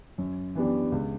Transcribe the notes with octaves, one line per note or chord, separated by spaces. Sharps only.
F#2
E3 B3 D4 G4
C#2